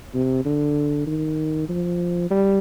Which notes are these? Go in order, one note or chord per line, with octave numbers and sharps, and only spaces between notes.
C3
D3
D#3
F3
G3